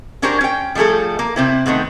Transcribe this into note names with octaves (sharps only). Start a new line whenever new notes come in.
C#4 D4 F#4 G4 A#4 C5
C#4 G5
F3 G3 A3 G#4 A4
A#3
C3 C4 E4
D#3 A3 B3 C4